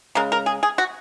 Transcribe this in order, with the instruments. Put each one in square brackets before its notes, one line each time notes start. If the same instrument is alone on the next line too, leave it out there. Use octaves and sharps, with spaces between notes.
[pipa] C#3 G#3 A#4
A#4
G#4
G#4
F#4